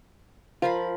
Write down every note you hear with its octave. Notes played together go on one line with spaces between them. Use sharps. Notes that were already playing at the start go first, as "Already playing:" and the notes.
F3 F4 A#4 B5